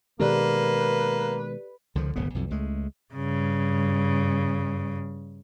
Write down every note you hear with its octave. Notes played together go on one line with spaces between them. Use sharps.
B2 D#3 G#3 A#3 G4 A4 B4 D5
C#2 D3 D#3 F3
D1 G#1 C#3 B3
B1 F2
C#2 G#3 A3
G2 C#3